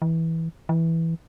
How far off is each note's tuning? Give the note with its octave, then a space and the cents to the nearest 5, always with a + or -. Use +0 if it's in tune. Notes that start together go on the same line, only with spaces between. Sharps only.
E3 -15
E3 -5